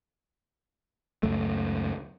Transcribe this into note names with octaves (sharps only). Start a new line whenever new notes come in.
C#2 F#2 A3